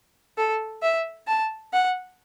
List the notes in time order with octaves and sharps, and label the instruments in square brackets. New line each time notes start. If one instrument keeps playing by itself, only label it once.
[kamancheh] A4
E5
A5
F#5